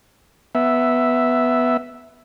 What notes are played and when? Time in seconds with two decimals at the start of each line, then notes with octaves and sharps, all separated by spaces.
0.55 B3 E5